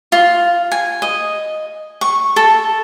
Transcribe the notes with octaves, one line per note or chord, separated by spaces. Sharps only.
F4
G#5
D#5
C#6
A4